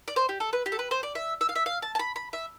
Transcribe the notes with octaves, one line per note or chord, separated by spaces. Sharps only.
D5
C5
G4
A4
B4
G4
A4
B4
C5
D5
E5
E5
F5
E5
F5
A5
A5
B5
B5
E5